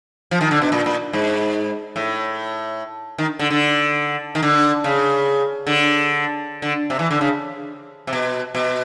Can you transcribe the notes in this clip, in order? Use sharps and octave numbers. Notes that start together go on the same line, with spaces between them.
F3
D#3
D3
B2
A#2
A#2
G#2
A2
D#3
D3
D3
D#3
D3
C#3
D3
D3
C3
E3
D3
C#3
C3
B2
B2